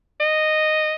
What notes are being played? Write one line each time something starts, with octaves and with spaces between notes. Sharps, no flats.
D#5